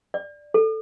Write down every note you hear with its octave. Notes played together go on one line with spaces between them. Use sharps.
D5
A4